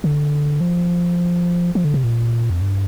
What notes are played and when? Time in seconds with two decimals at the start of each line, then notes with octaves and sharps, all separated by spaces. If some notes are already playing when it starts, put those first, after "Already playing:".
0.04 D3
0.60 F3
1.75 F3
1.85 D3
1.94 C3
2.04 A#2
2.50 F2
2.61 G2